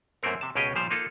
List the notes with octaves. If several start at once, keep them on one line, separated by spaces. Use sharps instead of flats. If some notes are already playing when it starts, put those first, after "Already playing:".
F#2 A3 A#3 C4 A#4
C3 A5
C#2 B2 C#4 G4 G#4 D#5
A#2 F3 G3 C5 F5
A#3 D#4 F4 A4